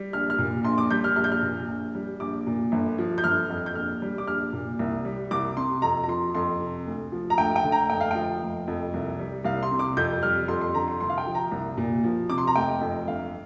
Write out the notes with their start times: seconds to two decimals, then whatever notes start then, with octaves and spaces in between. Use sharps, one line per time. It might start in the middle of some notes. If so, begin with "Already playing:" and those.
Already playing: G3
0.13 A#1 F6
0.30 F6
0.38 A#2
0.64 A#1 C6
0.78 D6
0.91 G3 G6
1.04 F6
1.16 A#1 F6
1.24 G6
1.32 F6
1.42 A#2
1.69 A#1
1.95 G3
2.20 A#1 D6
2.47 A#2
2.72 G1
2.98 F3
3.18 G6
3.24 G1 F6
3.50 F2
3.66 G6
3.75 A#1 F6
4.02 G3
4.18 D6
4.27 A#1 F6
4.53 A#2
4.79 C2
5.05 G3
5.31 C2 D6
5.57 C3 C6
5.82 F2 A#5
6.04 A#5
6.08 F3 C6
6.35 F2 C6
6.60 C3
6.86 D2
7.12 F3
7.30 A#5
7.38 D2 G5
7.56 G5
7.64 D3
7.72 A#5
7.90 F1 G5
8.01 F5
8.11 F3 G5
8.42 F1
8.68 F2
8.94 C2
9.19 G3
9.44 C2 F5
9.63 C6
9.71 C3
9.79 D6
9.97 F2 G6
10.23 G3 F6
10.48 F2 C6
10.61 C6
10.74 D3 A#5
10.88 C6
11.00 C2 C6
11.09 F5
11.18 G5
11.26 F3
11.35 A#5
11.51 C2
11.78 A#2
12.04 F3
12.30 C3 D6
12.38 C6
12.47 A#5
12.56 F1 G5
12.81 F2
13.07 G1 F5